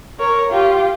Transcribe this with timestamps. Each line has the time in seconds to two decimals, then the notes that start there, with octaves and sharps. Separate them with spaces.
0.19 A#4 C#5
0.51 F4 G4